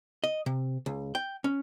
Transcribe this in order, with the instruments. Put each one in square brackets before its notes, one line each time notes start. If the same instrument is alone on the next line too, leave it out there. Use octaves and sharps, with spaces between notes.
[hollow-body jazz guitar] D#5
C3
C#2
G5
C#4